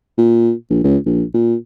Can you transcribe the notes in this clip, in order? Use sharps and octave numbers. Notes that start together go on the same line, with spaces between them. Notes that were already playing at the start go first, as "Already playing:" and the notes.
A#2
A#1
C#2
A#1
A#2